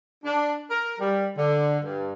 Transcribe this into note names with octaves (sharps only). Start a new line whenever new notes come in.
D4
A#4
G3
D3
G2